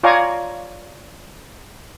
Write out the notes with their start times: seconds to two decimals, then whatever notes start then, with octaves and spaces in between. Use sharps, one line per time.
0.04 F4 C#5 D5 F5 G#5 A#5